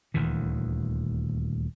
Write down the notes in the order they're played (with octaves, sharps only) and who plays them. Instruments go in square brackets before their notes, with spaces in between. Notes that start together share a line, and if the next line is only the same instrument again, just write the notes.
[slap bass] D#1 D2 D#3 E3